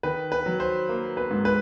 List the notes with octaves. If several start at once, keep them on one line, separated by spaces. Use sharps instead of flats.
D#3 B4
B4
F#3
C5
A#3
B4
G#2
B4